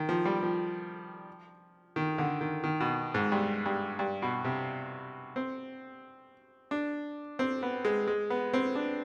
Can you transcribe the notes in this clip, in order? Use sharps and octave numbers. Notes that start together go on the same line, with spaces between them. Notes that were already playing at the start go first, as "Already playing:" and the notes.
Already playing: D#3
F3
G3
F3
D#3
D3
D#3
D#3
B2
G#2
G2
G2
G2
B2
C3
C4
D4
C4
B3
G#3
G#3
B3
C4
D4